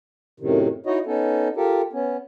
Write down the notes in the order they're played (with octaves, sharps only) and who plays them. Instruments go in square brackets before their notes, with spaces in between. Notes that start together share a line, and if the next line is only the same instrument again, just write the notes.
[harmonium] F#2 A2 C3 D#3
D#4 E4 F#4 C#5 D#5
B3 C#4 D#4 A4
F4 G4 A4 A#4
B3 C#4